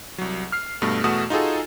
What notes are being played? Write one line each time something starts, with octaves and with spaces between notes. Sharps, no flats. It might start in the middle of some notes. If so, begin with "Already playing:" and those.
C2 F#3
F6 C7
G2 B2 A3
E2 B2 A3 F#4 D#6 E7
D#4 F4 F#4 G#4 A4